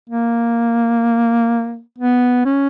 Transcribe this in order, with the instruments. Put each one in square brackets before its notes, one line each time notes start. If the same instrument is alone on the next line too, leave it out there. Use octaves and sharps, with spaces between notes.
[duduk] A#3
B3
C#4